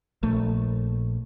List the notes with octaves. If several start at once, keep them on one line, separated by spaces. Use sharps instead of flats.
A#1 A3